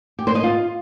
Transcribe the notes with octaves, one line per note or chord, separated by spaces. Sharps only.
G4
C5
D#5
F4